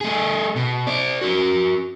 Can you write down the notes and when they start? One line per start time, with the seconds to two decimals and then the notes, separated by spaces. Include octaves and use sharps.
0.01 A3 G#4
0.56 B2
0.87 C5 D5
1.21 F#4 A#4